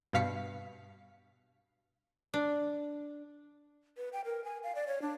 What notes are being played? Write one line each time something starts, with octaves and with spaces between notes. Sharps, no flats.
G2 B2 F5 B6 C#7
D4
B4
G5
A#4
G#5
F5
D5
C#5
D4